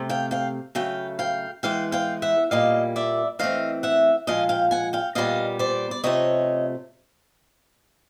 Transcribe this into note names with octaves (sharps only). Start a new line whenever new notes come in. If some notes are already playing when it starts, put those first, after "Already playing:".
Already playing: C3 A3
F5 G5
F5 G5
C#3 F#3 A3 F5 G5
F5 G5
E3 G#3 B3 F5 G5
F5 G5
E5 F#5
A#2 G3 A#3 D#5 F5
D5 E5
E3 A3 C4 D#5 F5
E5 F#5
A#2 F3 G#3 D#5 F5
F5 G5
F#5 G#5
F5 G5
A#2 G3 B3 D#5 F5
C5 D5
D5
C3 F3 A3 C#5 D#5